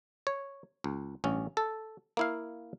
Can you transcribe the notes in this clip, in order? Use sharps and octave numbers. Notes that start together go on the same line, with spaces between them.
C#5
C#2
A1 G2 C#4
A4
A#3 E4 F5